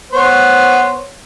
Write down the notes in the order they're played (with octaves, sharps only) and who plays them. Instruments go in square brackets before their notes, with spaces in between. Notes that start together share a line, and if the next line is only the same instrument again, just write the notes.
[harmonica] B3 C5 C#5